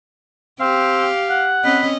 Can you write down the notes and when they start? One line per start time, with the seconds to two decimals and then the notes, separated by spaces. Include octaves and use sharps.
0.60 C4 G4 F5
1.30 F#5
1.64 C4 C#4 D#5 B5